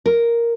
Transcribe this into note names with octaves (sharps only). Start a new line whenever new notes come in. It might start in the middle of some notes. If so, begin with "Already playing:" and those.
A#4